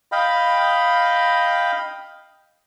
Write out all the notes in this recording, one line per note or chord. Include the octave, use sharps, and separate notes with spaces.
D#5 F5 G5 B5